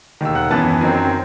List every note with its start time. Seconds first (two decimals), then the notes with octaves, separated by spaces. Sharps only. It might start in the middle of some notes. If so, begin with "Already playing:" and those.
0.21 E1 D#2 D#3 E6
0.35 F#5 F#6
0.50 F#2 E3 B3 A5 A6
0.81 F#2 D#3 F#3 C4